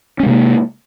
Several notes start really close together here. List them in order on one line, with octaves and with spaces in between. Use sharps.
C#4 G#3 C3 A#3